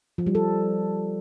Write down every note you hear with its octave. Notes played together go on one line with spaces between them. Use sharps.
F3
G3
A4